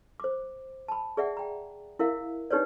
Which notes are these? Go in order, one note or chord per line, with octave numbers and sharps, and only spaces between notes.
C5 D6
A5 B5
G#4 D5 E5 F#5
G5 A#5
E4 A#4 E5 F5
D4 D#4 G4 B4 C#5 D5